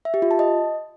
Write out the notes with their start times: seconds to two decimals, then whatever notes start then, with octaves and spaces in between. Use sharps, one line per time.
0.05 E5
0.14 G4
0.22 F4
0.31 A5
0.39 D#5